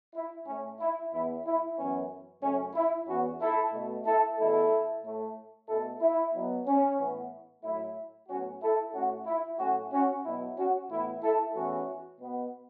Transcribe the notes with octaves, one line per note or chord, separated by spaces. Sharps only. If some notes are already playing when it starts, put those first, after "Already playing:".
E4
A2 A3 C#4
E4
E2 E3 B3 E4
E4
F#2 E3 B3 C#4
F#2 C#3 A3 C#4
E4
E2 E3 B3 C#4 F#4
E4 A4
B2 A3
E4 A4
E2 B2 A3 E4 A4
A2 A3
B2 A3 E4 A4
E4
B2 F#3 B3
C#4
A2 E3 B3
A2 F#3 A3 E4
A2 F#3 B3 C#4 F#4
E4 A4
A2 A3 C#4 F#4
E4
A2 F#3 A3 C#4 F#4
C#4 F#4
B2 F#3 B3 E4
C#4 F#4
A2 E3 B3 E4
E4 A4
E2 E3 A3 C#4 F#4
B2 B3